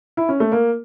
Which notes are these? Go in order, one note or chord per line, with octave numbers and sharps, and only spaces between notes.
E4
C#4
A3
A#3